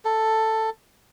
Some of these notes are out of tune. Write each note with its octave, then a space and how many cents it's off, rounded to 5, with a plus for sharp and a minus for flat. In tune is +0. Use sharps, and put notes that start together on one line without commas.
A4 +5